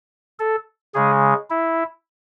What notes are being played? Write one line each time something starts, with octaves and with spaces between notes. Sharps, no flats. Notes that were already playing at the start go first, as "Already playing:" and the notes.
A4
C#3 G#3 G#4
E4